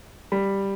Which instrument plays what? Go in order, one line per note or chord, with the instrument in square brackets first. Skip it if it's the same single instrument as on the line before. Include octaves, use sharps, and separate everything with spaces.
[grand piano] G3